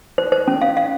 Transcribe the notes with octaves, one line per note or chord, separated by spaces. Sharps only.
C5
C5
C#4
F5
F5